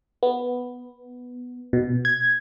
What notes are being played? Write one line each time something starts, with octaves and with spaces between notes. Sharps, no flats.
B3
B2
G#6